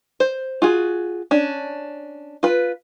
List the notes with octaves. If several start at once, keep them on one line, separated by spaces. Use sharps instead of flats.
C5
F4 F#4 G#4
C#4 D4
F4 B4